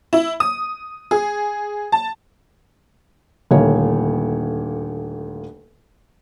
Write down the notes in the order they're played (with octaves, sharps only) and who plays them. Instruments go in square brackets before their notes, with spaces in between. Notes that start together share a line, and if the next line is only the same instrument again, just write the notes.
[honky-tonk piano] E4
D#6
G#4
A5
[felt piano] D#1 D2 A#3 C#5